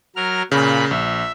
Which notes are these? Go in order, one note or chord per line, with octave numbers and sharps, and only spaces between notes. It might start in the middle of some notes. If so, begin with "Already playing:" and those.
F#3 A#4 F6
A#2 C#3 B5
A#1 E5